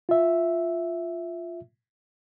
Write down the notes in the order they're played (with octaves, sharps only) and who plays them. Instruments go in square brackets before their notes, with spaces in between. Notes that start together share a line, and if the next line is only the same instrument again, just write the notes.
[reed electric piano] F4 E5